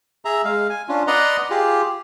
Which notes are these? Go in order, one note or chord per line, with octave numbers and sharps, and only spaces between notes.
G#4 E5 A#5
G#3 F5
G#5
C#4 D4 F4
B4 D5 D#5 F#5 A#5 C6
F4 G4 G#4